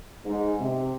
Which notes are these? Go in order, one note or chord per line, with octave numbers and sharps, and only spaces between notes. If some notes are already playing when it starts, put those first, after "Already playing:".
G#2
C3